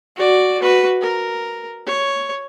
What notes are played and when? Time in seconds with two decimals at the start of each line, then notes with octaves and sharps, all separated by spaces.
0.16 F#4 D5
0.59 F#4 B4
1.01 A#4
1.86 C#5